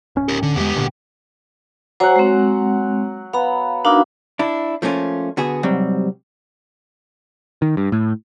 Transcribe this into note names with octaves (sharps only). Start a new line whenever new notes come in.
D1 C#4
G4 A#4
D3
E2 G#3 B3 G4
G#1 A#2 D3
F#3 C5 F#5 G#5 A#5
G#3 C4
B3 F5 A#5
A#3 D4 D#4 F#4 E5
D4 E4
F3 A3 A#3 C#4 F4
D3 B3 F#4 G#4
C2 G#2 F#3 G3 C4
D#3
G2
A2